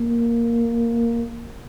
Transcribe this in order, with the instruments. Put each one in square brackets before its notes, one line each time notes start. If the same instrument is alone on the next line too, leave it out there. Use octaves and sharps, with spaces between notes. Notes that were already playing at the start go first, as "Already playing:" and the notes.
Already playing: [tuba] A#3